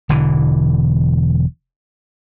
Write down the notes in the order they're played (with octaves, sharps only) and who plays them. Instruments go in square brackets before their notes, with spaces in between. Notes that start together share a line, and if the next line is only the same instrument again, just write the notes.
[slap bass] E1 D3 E3